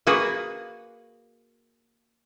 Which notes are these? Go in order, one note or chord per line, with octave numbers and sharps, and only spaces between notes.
A#3 F#4 G#4 B4